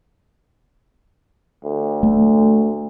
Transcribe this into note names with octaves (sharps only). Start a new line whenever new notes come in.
D2
A3